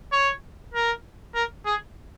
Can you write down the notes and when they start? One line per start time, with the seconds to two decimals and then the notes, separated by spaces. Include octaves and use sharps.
0.12 C#5
0.73 A#4
1.35 A#4
1.66 G#4